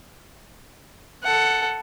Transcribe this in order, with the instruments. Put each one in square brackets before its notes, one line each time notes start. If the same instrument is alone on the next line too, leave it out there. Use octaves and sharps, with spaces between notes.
[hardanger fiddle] A4 F#5